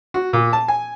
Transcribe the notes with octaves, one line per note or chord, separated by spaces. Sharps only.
F#4
A#2
A5
G#5